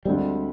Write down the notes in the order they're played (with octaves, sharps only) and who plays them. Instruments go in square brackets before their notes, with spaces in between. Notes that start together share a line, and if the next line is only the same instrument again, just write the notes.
[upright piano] D2 D3 G#3 C4 [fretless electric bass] G3